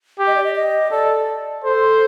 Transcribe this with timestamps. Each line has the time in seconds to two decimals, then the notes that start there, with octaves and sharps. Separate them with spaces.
0.19 G4
0.27 D#5
0.36 D5
0.44 D#5
0.55 D#5
0.91 A4 D5
1.63 A4 C5